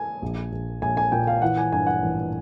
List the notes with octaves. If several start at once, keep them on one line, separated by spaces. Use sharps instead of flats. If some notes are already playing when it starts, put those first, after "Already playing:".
Already playing: G#5
A#1
A#1
A#1 G#5
G#5
A#2 G5
F5
E3 F#5
G#5
G2 G#5
F#5
A1